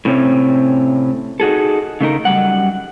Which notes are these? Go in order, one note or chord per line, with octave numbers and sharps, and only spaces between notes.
A2 C3 C4 C#4
D#4 F#4 G#4 A4
C#3 A3 D#4 A#4
F#2 G3 F#5